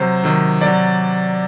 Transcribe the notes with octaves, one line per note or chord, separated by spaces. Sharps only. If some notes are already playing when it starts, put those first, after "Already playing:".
Already playing: C3 F#3 C5
C3 D#3 F#3
C3 F#3 D5